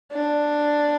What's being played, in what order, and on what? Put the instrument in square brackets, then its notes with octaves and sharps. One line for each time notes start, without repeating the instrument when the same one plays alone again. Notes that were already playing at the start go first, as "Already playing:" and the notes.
[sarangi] D4